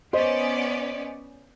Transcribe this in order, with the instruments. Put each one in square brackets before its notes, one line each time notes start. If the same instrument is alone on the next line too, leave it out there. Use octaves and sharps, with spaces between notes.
[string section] B3 C#4 D5 [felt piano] C5 D#5